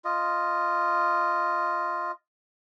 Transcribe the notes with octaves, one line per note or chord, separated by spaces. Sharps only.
F4 D#5